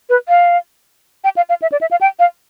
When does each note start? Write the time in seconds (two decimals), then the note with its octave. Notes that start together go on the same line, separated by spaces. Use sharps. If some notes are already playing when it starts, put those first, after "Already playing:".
0.09 B4
0.29 F5
1.24 G5
1.37 F5
1.49 F5
1.62 E5
1.72 D5
1.81 E5
1.91 F5
2.01 G5
2.19 F5